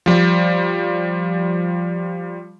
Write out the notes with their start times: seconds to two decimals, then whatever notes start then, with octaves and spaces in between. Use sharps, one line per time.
0.06 F3 G3